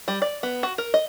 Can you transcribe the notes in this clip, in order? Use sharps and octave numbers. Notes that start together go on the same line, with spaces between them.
G3
D5
B3
F#4
A#4
D#5